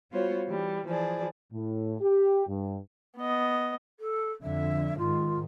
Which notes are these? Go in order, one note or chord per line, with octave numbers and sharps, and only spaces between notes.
G3 B3 F4 F#4 C5 C#5
E3 G3
E3 F3 G#4 D5
A2
G4
G2
B3 D#5
A4
F2 D3 E5
G#2 D#3 F4